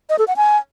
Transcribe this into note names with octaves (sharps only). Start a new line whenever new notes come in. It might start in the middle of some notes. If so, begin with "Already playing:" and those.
D#5
A4
F#5
G#5